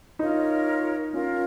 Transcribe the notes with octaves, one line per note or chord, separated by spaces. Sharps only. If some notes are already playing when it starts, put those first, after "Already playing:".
D#4 F4 A#4 C#5
C#4 F4 A#4 C#5